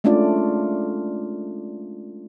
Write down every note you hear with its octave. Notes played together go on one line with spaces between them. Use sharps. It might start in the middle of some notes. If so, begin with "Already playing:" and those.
G#3 A3 C#4 D4 F4 D5